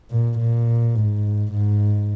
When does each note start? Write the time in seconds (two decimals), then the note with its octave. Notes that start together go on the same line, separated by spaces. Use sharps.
0.10 A#2
0.38 A#2
0.95 G#2
1.53 G#2